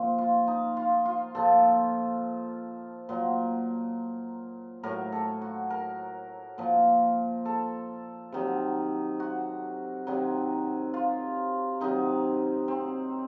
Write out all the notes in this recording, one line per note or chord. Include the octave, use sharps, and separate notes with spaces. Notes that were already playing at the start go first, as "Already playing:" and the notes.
Already playing: A#2 F3
F4
D#4
F4
F4
A#2 F3 A4
A#2 F#3
A2 F#3 A#4
A4
F#4
A#4
A#2 F3
A4
C3 D#3 F#3
F#4
C3 D#3 F#3
F4
C3 D#3 F#3 D#4
C4